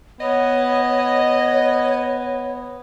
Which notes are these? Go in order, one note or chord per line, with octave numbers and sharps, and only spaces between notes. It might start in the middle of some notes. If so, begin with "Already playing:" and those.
B3 C#5 D#5